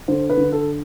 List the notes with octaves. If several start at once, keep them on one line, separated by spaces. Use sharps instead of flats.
D3 C5
B4
D3
A4